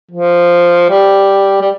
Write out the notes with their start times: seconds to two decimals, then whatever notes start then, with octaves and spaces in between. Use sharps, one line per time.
0.11 F3
0.90 G3
1.61 G3